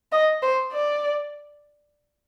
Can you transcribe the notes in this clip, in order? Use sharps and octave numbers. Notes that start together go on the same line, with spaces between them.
D#5
C5
D5